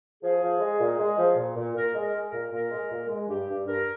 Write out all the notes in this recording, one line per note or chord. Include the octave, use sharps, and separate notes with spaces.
F3 G#4
F3
G#3
A#2
G#3
F3
A#2
A#2
A#2 A#4
G#3
A#4
G#3
A#4
A#2
A#2 A#4
G#3
A#2
G#3
G2 G4
G2
G2 A#4